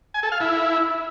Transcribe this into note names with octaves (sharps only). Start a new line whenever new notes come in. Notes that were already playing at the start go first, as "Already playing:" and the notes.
G#5
A4
F5
E4